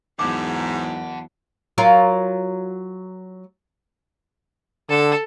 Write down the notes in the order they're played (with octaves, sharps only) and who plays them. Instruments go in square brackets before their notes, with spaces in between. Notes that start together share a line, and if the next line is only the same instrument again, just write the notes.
[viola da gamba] E2 F#3 B3 [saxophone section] G#2 [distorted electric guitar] F#5 A5 [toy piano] D6
[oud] F#3 F4 A#4
[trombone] D3 [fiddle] A4